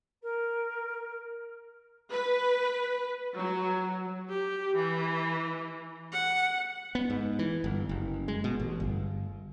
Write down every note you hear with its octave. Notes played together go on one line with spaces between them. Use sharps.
A#4
B4
F#3
G4
E3
F#5
B3
G#2
E3
G1
F#1
G#3
B2
A1
G1